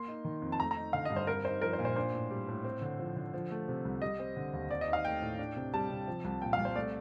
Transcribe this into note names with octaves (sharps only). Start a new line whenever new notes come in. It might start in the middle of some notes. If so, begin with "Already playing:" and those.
Already playing: A#3 C6
D#4
D#3
F2
A5
A3 A#5
A#5
D#4
D3 F5
D#5
G2
C5
C4 A#4
D#4 C5
F3 A#4
C5
A#2
C5
D4 C5
A2
G3
A2
C4
D3
F3
D3
F3
A3
C3
C2
G3 D#5
C4
D3
D#2
C4 D5
D#5
D#4 F5
A3 G5
A2
D4
C3
G3 A5
C3
F3
C2
A#2 G5
F5
C2
C5
A3 D5